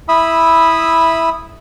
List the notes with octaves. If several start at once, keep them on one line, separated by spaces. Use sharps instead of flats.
E4 E5 B5 D#6 E6